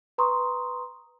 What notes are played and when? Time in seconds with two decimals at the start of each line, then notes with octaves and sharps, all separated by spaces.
0.18 B4 A#5 C6 C#6 D#6